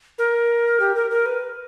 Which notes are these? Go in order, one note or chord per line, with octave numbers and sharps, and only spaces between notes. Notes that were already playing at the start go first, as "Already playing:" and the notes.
A#4
G4
A#4
A#4
B4